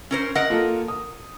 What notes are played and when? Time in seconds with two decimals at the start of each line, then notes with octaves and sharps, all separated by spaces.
0.11 C#4 A#4 C5
0.35 A#4 D#5 F#5
0.50 A#3 F4 A4
0.88 D#6